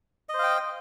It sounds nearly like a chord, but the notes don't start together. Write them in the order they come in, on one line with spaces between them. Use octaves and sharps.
D#5 C5 F5 G5